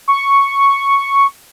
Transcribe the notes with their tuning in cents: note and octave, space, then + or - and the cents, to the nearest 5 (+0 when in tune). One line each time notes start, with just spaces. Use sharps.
C#6 +0